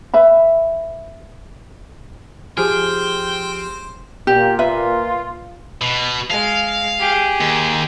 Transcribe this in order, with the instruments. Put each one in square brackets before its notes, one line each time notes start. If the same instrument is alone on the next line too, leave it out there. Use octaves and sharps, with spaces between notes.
[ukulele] B4 E5 B5
[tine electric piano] F3 G4 F6 [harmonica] C4 C5 [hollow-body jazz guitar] G#4 [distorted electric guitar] G5
[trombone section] A#2 [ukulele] G4
[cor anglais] F4 [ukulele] B4 E5
[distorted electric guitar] B2
[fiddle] G#3 [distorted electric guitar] F5
[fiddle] G4 G#4
[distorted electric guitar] D#2